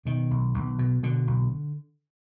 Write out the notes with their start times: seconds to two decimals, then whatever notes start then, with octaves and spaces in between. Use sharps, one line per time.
0.05 B2 D#3
0.31 B1
0.54 B1
0.79 B2
1.03 B2 D3
1.27 B1